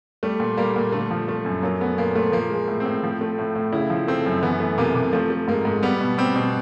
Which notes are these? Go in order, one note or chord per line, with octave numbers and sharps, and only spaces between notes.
G3 A3
A#2
G3 A#3
A#2
D3 A3
F3
A3
F#2
F#3 A#3
A3 B3
A#2 A#3
A#2 A3
F3 A#3
G#3
A2
A2 C4
F3
A3
A2
A2
C#3 E4
F3
A3 C4
F#2
E3 B3
A3
C3 A#3
C3
F3 A3
A3
G#2 A#3
G#2
G3 B3
B2
G3 C4
B2